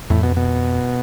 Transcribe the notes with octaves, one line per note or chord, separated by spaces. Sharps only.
F2 A2
B2
B2